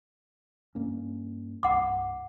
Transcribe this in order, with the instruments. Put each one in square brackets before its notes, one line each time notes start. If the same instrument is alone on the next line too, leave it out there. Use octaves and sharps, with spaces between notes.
[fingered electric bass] G2 A#3 C#4
[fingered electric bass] C2 G2 [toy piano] F#5 D6